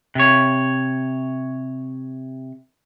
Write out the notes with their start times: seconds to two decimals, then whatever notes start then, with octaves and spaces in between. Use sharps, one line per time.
0.15 C3 C#5